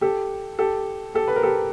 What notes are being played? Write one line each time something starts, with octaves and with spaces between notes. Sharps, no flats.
G4 A4
G4 A4
G4 A4
B4
A#4
G4 A4